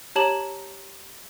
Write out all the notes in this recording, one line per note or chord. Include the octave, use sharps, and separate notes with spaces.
G4 C#5 A5 A#5 E7 F#7